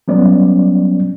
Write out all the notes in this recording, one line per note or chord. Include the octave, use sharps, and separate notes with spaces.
F#3 G3 B3 C#4 D5